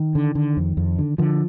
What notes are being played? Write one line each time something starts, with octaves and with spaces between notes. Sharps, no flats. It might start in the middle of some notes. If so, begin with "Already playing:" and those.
Already playing: D#3
D3
D3
F2
F2
D3
D3 F3